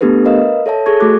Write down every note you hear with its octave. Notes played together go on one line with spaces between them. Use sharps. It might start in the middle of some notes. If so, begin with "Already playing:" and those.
A3 B3 D4 G4 A4 B4
A#4 B4 D#5 F5
A4 C#5 E5 A5
G#4 A4 C#6 G#6
A3 F#4 D6 F#6